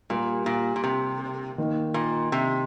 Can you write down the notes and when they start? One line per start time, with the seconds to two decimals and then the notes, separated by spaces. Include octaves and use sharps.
0.10 A#2 G3 A#3 G4
0.46 A#2
0.76 A#2
0.84 C3
1.58 D#3 A#3 D#4
1.94 A#2
2.32 C3